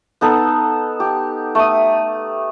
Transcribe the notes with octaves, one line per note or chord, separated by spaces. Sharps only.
B3 D#4 A4
G4
A3 D#6